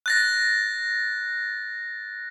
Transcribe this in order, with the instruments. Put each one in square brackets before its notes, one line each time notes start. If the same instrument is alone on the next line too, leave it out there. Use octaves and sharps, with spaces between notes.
[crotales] F#6 A6 A#6